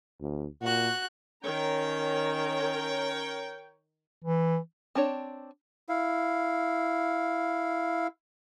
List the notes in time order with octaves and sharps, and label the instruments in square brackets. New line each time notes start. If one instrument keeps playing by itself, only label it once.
[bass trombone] D2
[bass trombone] A#2 [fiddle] F#4 F#6
[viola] D#3 A#5 [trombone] C#4 [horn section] A#4 C#5 G5
[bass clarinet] E3
[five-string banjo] C4 D4 C#5
[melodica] E4 F5